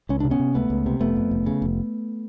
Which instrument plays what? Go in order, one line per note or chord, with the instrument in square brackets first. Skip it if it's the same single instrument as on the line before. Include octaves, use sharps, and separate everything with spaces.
[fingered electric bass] C#2 C#4
C3 D4
B3 C#4
C3
C#2 A3 B3
C#2
C3
F1 A3 B3
F2
F1
C#3
F1